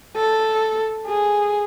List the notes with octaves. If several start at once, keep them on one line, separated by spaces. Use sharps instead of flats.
A4
G#4